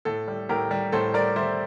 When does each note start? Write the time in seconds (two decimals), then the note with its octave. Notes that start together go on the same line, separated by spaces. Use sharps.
0.05 A2 A4
0.28 G3
0.49 A2 G4 A#4
0.71 G3
0.92 A2 A4 C5
1.14 G3 A#4 D5
1.36 G3 C5 E5